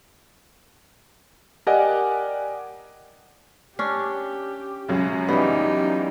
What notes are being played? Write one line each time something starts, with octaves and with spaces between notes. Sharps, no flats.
G4 A#4 D5 D#5 F#5 G#5
C#4 D4 G4
C#2 F#2 F#3
E3 G3 B3 D#4